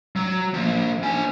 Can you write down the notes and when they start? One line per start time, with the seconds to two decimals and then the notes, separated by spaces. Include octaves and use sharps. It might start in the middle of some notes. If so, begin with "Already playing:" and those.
0.16 F#3
0.54 F3 A#3
1.03 D4 G#5